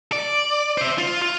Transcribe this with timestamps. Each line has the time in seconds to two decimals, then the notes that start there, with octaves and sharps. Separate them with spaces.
0.12 D5
0.78 C5 E5
0.98 F4
1.22 F4